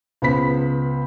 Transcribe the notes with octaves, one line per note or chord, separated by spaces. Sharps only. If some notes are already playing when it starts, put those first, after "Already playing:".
C#2 B3 C5 B5 B6